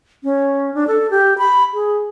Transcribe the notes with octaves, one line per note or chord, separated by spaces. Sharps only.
C#4
D4
A4
G4
B5
G#4